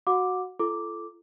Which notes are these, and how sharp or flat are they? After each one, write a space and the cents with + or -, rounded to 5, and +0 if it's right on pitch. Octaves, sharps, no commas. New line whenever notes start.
F#4 +0 F#5 -30 D6 +0
F4 -45 A4 -15 D6 -5